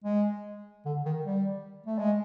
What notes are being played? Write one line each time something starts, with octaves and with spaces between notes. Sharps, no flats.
G#3
D3
D#3
G3
A3
G#3